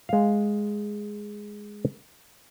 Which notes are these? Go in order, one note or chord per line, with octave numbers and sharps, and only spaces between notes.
G#3 F5